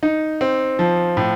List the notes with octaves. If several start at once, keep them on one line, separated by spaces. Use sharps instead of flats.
D#4
C4
F3
A2